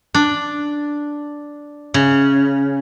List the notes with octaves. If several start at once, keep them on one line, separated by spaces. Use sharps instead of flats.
D4
C#3